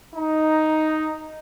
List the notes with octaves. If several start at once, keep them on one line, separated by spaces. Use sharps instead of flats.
D#4